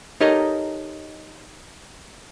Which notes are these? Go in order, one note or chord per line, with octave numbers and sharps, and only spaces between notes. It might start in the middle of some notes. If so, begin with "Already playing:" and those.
D#4 G4 A4 A#4 C#5 D#5